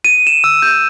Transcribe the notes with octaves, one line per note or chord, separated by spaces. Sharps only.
D#7
E7
E6
G6